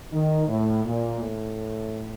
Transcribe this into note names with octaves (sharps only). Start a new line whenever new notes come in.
D#3
A2
A#2
A2